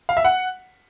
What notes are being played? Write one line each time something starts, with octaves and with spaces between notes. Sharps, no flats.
F5
E5
F#5